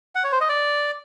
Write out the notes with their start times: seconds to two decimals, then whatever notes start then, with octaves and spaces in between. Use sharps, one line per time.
0.15 F#5
0.24 C#5
0.32 C5
0.41 D#5
0.49 D5